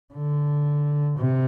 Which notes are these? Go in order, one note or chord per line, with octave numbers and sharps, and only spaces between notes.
D3
C3